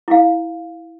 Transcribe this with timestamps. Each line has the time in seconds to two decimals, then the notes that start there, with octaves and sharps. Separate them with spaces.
0.08 E4 F5